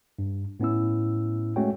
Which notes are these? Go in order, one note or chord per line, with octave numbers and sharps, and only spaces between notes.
G2
A2 B3 C#4 E4 E6
G#3 A3 C#4 F#4 C#5 G5